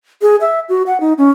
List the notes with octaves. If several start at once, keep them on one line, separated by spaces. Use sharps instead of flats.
G#4
E5
F#4
F#5
D#4
C#4